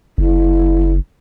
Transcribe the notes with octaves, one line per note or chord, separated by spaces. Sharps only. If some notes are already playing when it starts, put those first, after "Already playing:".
F#1 E4